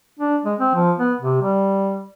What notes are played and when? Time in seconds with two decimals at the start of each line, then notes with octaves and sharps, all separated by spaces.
0.20 D4
0.45 G#3
0.60 C4
0.75 F3
0.98 B3
1.22 C3
1.42 G3